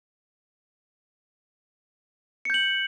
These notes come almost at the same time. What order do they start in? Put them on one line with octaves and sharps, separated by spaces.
C#7 G6 F#7